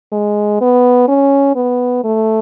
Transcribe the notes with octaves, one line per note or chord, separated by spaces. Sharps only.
G#3
B3
C#4
B3
A3